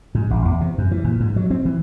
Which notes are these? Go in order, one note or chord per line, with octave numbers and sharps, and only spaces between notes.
G#2
A1
E2
C3
F#2
E3
A#2
G#2
F#3
C4
E3